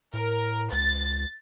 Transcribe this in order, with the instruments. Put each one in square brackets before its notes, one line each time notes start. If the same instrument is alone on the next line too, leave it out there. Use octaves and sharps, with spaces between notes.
[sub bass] A2 [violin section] A#4
[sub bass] C#2 [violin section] A6